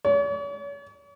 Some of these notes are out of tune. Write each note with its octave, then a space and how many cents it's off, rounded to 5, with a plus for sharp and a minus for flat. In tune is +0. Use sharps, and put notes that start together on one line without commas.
C#5 +45